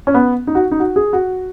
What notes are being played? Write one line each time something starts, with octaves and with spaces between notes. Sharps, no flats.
C#4
B3
D#4
F#4
D#4
F#4
G#4
F#4